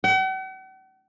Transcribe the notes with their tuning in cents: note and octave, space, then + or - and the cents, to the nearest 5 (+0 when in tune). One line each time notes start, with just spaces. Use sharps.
F#5 +45